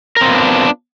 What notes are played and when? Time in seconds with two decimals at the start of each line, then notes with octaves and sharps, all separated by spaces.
0.17 A#4
0.21 C4
0.26 F4
0.30 B3
0.35 D4